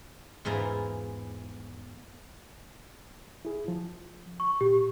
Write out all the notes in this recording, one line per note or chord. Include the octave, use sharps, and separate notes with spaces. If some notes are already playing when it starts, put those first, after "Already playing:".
E2 G#2 E4 F4 A#5
E4 G#4
F3
C#6
A#2 G4